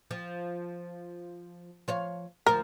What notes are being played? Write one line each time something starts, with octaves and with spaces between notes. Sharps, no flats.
F3
F3 C#5 F5
D2 F3 A#4